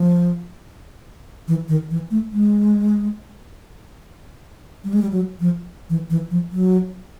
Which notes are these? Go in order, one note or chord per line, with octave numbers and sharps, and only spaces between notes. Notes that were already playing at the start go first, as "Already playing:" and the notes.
Already playing: F3
E3
D#3
E3
A3
G#3
G3
G#3
G3
F#3
F3
E3
E3
F3
F#3